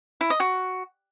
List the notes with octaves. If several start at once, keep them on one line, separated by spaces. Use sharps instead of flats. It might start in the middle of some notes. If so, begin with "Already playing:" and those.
E4
D#5
F#4